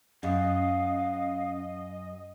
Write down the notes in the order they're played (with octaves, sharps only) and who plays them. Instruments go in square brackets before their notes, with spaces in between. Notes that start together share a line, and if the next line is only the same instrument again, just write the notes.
[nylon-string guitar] F#2 [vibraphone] C#4 D#6 [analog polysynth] D#5 [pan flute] F5